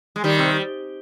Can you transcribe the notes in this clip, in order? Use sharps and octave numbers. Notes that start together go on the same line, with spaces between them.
G#3
D#3 G3
C3